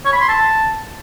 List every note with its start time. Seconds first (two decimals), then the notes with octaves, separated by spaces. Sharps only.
0.05 C#5
0.13 B5
0.21 C6
0.29 A5